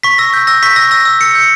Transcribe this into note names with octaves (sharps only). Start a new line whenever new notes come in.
C#6 B6
E6 A#6
C#6 G6
E6 A#6
C#6 B6
E6 A#6
E6 A#6
E6
E6 C#7
G6 C#7